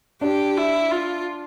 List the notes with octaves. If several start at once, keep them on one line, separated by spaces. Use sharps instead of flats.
D4 G4
E4
F4